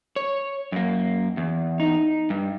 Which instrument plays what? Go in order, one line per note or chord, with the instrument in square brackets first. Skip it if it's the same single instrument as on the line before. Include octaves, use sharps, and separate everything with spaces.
[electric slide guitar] C#5
F#2 A#3
E2
[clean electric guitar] D#4
[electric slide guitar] G2